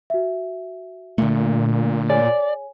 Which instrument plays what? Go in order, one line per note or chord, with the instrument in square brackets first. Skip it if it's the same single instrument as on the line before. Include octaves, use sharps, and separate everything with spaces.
[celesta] F#4 E5
[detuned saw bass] A#2 [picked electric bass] D3 A3
[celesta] G#4 C#5 G#5 [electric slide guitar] D5